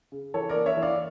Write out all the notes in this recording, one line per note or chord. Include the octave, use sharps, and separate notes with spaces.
C#3
E3 A4 C#5
A#4 D5
A#3
C#5 E5
E3
D5 F5